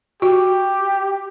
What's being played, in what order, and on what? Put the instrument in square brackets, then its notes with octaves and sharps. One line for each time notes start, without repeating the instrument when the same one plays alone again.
[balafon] F#4 [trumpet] G4